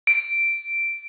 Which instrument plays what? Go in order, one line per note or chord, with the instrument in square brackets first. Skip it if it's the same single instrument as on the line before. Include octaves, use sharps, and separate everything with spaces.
[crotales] D7